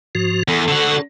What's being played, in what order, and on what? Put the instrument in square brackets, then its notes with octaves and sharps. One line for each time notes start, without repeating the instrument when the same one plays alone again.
[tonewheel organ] G#2 F3 F#4
[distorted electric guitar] E2 [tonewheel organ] A4
[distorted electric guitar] D3 F#4